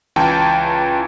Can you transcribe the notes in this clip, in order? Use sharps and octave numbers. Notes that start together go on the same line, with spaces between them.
C#2 E3 G5 A5